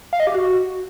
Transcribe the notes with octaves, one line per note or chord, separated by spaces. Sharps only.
F5
D#5
G4
F#4